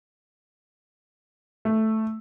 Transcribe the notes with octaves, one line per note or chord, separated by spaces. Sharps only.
A3